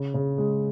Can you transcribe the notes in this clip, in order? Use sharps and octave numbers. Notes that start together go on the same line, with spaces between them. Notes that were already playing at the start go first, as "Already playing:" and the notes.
Already playing: C#3
C#3
G#3